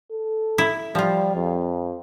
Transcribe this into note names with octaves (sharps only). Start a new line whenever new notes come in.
A4
E4
F3 G3 F4
F2